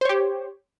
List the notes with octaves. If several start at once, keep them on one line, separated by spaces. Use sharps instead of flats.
G4 C5 C#5